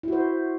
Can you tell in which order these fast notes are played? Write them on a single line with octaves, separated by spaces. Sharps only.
E4 F#4 C5